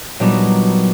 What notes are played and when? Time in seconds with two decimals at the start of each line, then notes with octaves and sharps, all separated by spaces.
0.20 A#2 F#3 G3 B3 D4 D#4